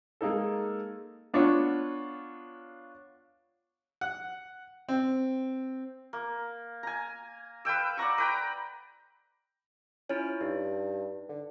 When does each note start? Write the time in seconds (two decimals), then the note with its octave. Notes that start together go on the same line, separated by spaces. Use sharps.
0.21 G#3 A#3 D#4 A4
1.34 B3 D4 F4 C#5
4.01 F#5
4.89 C4
6.13 A#3
6.83 G#5 A#5
7.65 B4 F5 G5 E6
7.97 D5 F#5 A#5 C#6
8.18 B4 G5 A#5
10.10 C#4 E4 F4 C#5
10.41 G2 D#4
11.29 D3